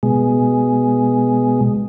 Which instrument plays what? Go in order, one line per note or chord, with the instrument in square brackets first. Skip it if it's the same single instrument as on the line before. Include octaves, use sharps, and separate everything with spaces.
[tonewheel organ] B2 G#3